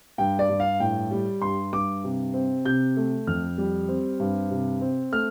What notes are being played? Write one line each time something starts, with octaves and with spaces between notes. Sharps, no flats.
G2 G5
D5
G2
F5
A2 G5
G3
G2 C6
G2 D6
C3
C4
C3 G6
A3
F2 F6
G3
C4
G2
C3
C4
A3 F6